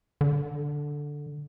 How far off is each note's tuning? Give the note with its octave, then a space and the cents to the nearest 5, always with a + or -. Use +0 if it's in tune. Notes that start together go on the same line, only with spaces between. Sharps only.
D3 +0